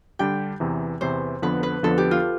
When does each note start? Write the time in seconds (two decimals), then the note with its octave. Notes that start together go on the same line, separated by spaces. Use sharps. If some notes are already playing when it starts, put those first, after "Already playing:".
0.19 D3 G3 D4 G4 G5
0.60 E2 C3 E3
1.01 E2 C3 E3 C5
1.42 F2 D3 F3 B3 B4
1.63 B4
1.83 F2 D3 F3 B3 A4
1.98 G4
2.11 F4